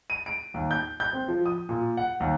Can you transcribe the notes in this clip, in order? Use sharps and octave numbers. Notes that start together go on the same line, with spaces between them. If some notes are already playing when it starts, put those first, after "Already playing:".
D#7
D7
D#2
G6
G6
C4
F3
D#6
A#2
F#5
D#2